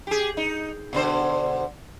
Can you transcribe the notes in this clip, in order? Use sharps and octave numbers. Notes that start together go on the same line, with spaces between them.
G4 G#4
D#4
B2 D3 C5